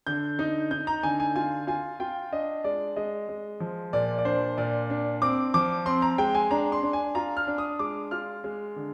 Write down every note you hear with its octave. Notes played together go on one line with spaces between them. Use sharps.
D3 G6
D#4
D#4 G6
A#5
D3 G#5
G#5
F4 G#5
F4 G#5
F4 G5
D4 D#5
G#3 D5
G#3 D#5
G#3
F3
A#2 D5
D5
D4 C5
A#2 D5
D4
C4 D6
F3 D6
C4 C6
A#5
G#3 G5
G#5
D4 A#5
C6
D4
G#5
F4 A#5
F6
D4
D#6
G#3 D6
F4 F6
G#3
D3